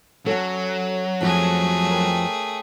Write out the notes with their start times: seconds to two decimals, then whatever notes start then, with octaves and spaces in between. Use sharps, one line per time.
0.26 F#3 C#4 A4 F#5
1.21 F2 F3 A3 F#4 G#4 A4
1.90 A#4 G5